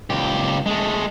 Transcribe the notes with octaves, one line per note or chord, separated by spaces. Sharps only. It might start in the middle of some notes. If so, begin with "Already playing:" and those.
C#2 G4
G#3 A3